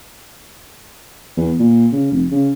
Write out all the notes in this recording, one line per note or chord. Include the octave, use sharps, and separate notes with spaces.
E2
A#2
C#3
F1
C#3